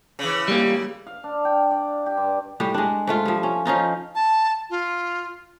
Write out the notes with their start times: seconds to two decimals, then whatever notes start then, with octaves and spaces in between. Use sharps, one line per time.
0.19 C#3 E3
0.48 G3 A#3
1.07 F5
1.24 D4
1.45 G5
1.71 D5
2.06 G4
2.17 G2
2.60 A2 G3 G4
2.74 G#3 D4
3.07 G#2 A3 F4
3.26 F3 G3
3.43 C#4
3.65 F3 C#4 D#4 F4
4.15 A5
4.70 F4